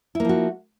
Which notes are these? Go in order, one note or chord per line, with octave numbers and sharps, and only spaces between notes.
F3 A#3 E4 F#4